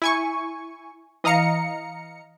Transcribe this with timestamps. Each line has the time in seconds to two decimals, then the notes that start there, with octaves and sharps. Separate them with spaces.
0.02 E4 G#5 C#6
1.24 E3 D#5 F5 A#5 C#7